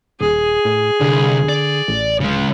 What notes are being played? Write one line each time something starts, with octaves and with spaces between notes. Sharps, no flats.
D#1 G#4
A2
C2 D3
D5
A1
D1 C#3 G#3